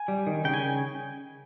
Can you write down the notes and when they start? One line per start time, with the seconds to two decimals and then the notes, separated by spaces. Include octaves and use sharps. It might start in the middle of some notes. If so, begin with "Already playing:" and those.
Already playing: G#5
0.08 G3
0.27 D#3
0.44 C#3 G5
0.54 G#5